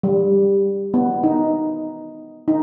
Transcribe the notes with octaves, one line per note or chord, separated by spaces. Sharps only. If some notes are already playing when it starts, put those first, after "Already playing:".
G3
B3
D#4
D#4